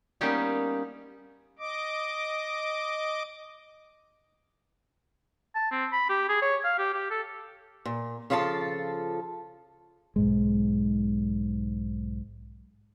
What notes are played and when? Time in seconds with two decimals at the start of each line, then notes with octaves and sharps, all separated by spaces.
0.21 G3 A#3 B3 C#4 D#4 G4
1.59 D#5 D6
5.55 A5
5.71 C4
5.93 B5
6.10 G4
6.29 G#4
6.42 C#5
6.64 F5
6.79 G4
6.94 G4
7.11 A4
7.85 A#2
8.30 C#3 F3 F4 A4 A5
10.16 B1 G#2 G#3